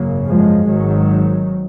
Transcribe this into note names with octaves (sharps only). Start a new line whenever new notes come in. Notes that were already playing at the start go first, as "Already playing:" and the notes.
Already playing: G#1 F#2 C#3 F#3 A#3
F3 G#3
G#1 G#2 D#3 F#3